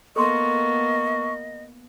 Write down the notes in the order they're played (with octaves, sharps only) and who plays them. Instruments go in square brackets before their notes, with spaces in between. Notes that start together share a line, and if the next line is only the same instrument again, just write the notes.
[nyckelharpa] A#3 B3 [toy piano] A4 C6 [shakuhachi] D#5 [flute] C#6